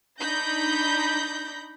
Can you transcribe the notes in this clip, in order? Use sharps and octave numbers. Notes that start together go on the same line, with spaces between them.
D4 D#4 B5 G6 A#6